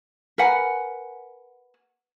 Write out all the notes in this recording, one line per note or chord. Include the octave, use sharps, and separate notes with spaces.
A#4 B4 F#5 G#5